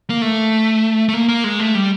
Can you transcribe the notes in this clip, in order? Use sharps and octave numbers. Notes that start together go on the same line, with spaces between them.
A#3
A3
A3
A#3
A#3
G#3
A3
G3